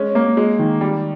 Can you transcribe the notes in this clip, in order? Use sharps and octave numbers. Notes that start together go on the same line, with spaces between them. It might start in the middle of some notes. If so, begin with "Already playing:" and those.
Already playing: G#3 C#4
A#3
G#3
D#3
G3